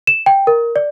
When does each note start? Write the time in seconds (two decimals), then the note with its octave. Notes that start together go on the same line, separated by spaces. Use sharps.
0.07 E7
0.26 G5
0.47 A#4
0.76 D5